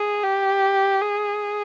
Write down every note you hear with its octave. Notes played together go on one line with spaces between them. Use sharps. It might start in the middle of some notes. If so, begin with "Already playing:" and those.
Already playing: G#4
G4
G#4